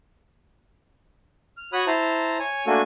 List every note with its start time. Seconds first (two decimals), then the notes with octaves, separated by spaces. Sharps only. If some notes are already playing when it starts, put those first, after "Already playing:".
1.57 F6
1.73 F#4 C#5 B5 D#6 F#6
1.87 E4 C5 A5 A#5
2.39 C#5 G#5
2.67 A3 A#3 D4 F#4 A4 G#5